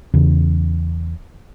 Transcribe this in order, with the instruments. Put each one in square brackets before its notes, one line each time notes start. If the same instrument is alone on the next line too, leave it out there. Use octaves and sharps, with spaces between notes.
[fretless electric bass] E2 C#3